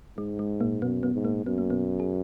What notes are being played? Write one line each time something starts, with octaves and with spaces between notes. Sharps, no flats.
G#2 G#3
G#3
A#2 A#3
F#2 B2 B3
B2 B3
G#2
A#2 A#3
F#2 B3
A#3
B2 B3
G#4